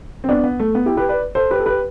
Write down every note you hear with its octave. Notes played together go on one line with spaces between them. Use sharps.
C4
B3 D4
B3
A3
B3
E4 G4
G4 B4
B4 D5
A4 C5
G4 B4
A4
G4 B4